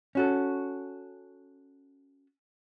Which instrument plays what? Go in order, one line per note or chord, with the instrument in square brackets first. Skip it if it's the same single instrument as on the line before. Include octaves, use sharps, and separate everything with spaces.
[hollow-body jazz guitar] C#4 F#4 A4